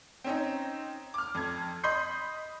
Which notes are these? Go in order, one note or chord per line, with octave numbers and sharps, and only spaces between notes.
C4 C#4 D#4
D6 F6
F2 G#6
D#5 B5 C6 G6 C7